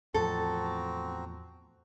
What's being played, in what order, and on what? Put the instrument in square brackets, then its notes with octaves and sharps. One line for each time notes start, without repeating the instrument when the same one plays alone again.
[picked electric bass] E2 A2 F3 [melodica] C4 F#4 A#5 [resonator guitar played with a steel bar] A4